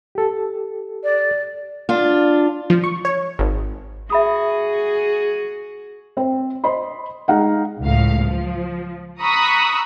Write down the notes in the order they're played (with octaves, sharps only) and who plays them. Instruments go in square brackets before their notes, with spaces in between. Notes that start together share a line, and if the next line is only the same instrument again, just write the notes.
[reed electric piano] G4 A4
[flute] D5
[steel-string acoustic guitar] D4 F4
[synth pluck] F3
C#6
C#5
G#1
[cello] F#4 G#4 [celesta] E5 B5 D#6
[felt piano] C4 C5
C5 D#5 B5 C6
G#3 D#4 F5 F#5
[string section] C#2 A2 F5
F3
A#5 B5 C#6 D#6 E6 F#6